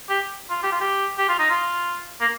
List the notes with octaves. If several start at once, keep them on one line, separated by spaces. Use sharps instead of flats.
G4
F4
G4
F4
G4
G4
F4
D#4
F4
A#3